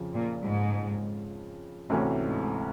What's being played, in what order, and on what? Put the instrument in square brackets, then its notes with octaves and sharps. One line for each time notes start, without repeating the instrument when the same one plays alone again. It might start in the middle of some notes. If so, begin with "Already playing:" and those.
Already playing: [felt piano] F2 C#3 F3
[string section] A#2
G#2
[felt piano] D2 C3 E3 A3 C#4 [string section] A2
[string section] G#2